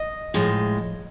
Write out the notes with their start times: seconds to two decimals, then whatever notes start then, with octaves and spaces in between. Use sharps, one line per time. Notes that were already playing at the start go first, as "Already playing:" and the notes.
Already playing: D#5
0.34 A2 F3 G#3